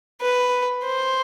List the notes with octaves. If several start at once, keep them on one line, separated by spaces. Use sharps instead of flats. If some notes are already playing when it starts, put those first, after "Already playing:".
B4
C5